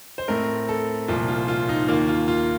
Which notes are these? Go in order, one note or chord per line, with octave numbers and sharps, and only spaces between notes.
C5
A2 A3 C4 A#4
A4
C2 A#2 F3 F4
F4
F4
D#4
D#2 D#3 A#3 F4
F4
F4